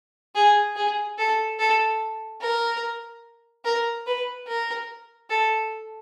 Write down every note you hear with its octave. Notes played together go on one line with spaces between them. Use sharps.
G#4
G#4
A4
A4
A#4
A#4
B4
A#4
A4